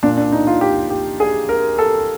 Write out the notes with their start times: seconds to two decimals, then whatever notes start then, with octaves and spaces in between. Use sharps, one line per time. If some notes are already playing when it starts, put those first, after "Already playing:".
0.03 A#2 D4
0.17 D4
0.32 D#4
0.47 F4
0.61 G4
0.90 G4
1.20 G#4
1.49 A#4
1.79 A4